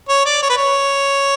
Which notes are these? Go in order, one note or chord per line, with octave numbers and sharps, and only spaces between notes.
C#5
D5
C#5
B4
C#5